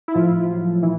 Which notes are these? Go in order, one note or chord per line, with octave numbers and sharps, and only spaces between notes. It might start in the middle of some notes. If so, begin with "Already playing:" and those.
E4
A2 F3 F4
F#3
A#2 E3 E4